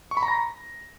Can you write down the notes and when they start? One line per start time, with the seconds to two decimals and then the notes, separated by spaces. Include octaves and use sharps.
0.11 C#6
0.17 B5
0.23 A#5
0.28 A#6